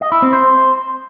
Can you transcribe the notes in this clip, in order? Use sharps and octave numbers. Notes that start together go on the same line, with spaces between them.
D#5
E4
C4
C5